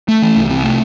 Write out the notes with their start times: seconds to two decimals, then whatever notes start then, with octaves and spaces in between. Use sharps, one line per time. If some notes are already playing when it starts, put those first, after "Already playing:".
0.08 A3
0.22 E3
0.36 C2
0.50 C3
0.63 A3